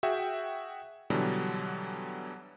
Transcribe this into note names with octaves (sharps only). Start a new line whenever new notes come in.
F#4 G#4 E5 G5
B2 D3 E3 F#3 G3